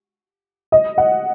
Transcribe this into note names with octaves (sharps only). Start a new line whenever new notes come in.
D#5
F#5